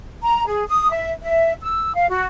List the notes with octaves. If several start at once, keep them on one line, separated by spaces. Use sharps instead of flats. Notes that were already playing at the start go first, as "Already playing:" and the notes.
A#5
G#4
D#6
E5
E5
E6
F5
F#4